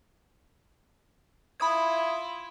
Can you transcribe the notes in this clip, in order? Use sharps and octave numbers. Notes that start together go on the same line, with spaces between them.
E4 F4 B5 D#6 G#6